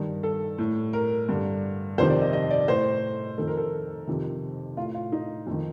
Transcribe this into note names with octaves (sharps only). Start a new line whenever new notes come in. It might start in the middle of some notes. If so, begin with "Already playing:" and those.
Already playing: G2 D#3
A4
A2
A#4
G2 D3
F2 C3 D#3 C5
D5
D#5
D#5
D5
A2 C5
F2 D#3 A4
A#4
A4
F2 C3 D#3
A2 F4
F4
D#4
F2 D#3